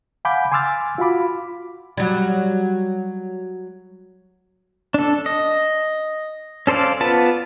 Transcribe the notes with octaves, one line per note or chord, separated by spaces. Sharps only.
F5 F#5 G#5 B5 D6 G6
G#5 C6 D6 E6 F6 A6
F4 F#4 F5 B5 D6
F#3 G3
D4 A4
D#5
C#4 A4 C5 D5 F5
B3 F4 B4 A5